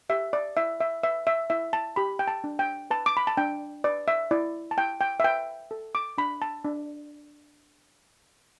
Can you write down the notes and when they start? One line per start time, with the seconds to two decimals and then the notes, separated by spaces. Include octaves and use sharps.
0.09 G4 E5
0.33 D5
0.57 E4 E5
0.80 E5
1.04 B4 E5
1.27 E5
1.50 E4 E5
1.73 A5
1.96 G4 B5
2.19 G5
2.28 A5
2.44 D4
2.59 G5
2.91 B4 A5
3.06 D6
3.17 B5
3.27 A5
3.37 D4 G5
3.84 B4 D5
4.08 E5
4.31 E4 D5
4.71 A5
4.77 E4 G5
5.01 G5
5.20 E5
5.24 B4 G5
5.71 A4
5.95 D6
6.18 D4 B5
6.42 A5
6.65 D4